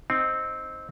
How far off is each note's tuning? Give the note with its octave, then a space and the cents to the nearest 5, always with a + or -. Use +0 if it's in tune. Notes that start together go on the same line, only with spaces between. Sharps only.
C4 +0 D#4 +0